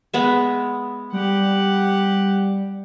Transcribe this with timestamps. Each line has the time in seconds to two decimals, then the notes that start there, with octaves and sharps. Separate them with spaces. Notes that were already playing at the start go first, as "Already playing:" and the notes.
0.14 G#3 B3 E5
1.13 G3 G4 F#5